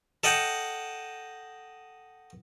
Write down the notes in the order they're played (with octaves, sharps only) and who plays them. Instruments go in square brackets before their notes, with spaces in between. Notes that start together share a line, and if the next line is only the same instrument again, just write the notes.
[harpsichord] A4 D#5 F#5 G5